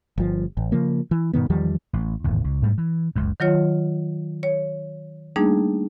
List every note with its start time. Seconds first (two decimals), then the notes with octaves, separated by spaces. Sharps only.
0.18 G1 F3
0.57 A1
0.72 C#3 F3 A#3
1.11 E3
1.33 G2 B2 D#3 B3
1.50 E2 D#3 F3 G3
1.93 A1
2.24 D1 G#1 E2
2.44 C#2
2.62 G#2 G3 A3
2.78 E3
3.16 F#1 C#2 F#2
3.40 D#3 F#3 F4 C#5
4.43 C#5
5.36 G3 A3 A#3 D4 D#4 G#4